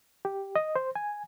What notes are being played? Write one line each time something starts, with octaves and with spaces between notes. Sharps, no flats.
G4
D#5
C5
G#5